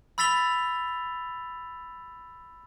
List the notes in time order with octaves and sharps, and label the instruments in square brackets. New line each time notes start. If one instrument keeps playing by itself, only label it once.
[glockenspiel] B5 E6 A6 B6 F7 G7